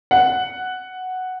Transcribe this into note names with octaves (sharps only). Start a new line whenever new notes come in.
F#5